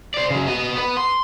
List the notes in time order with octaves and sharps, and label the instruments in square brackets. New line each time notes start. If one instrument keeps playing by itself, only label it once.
[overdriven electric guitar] C5 D5
C#3 F#3
B3 D#5
B3 B4
C6